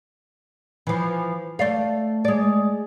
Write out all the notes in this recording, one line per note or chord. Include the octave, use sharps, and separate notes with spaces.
E3 F3
A3 D5 F5
G#3 D5